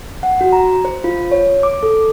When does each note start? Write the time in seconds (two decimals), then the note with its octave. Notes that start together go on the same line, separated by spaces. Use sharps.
0.23 F#5
0.41 F#4
0.53 A#5
0.85 C5
1.04 F4
1.32 C#5
1.63 D6
1.83 A4